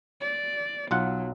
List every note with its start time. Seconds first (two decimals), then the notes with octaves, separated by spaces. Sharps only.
0.21 D5
0.91 B1 F#3 F4 F#5